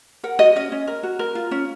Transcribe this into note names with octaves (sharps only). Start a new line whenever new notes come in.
A#4 F#5
F#4 D#5
C#4 D#5
C#4
A#4
F#4
A#4
F4
C#4